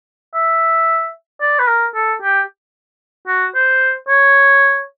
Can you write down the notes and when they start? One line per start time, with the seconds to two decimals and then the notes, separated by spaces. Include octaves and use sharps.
0.35 E5
1.41 D5
1.59 B4
1.68 A#4
1.95 A4
2.22 G4
3.28 F#4
3.55 C5
4.08 C#5